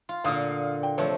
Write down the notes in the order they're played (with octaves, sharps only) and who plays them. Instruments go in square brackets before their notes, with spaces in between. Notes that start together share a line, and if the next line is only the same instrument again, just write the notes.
[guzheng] F4
[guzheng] A#2 D3 [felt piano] F5 D#6
[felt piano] G5
[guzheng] C3 F3 A3 [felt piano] C#5